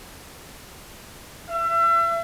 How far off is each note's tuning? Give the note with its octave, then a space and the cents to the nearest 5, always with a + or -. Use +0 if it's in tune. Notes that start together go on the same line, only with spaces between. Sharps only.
E5 +35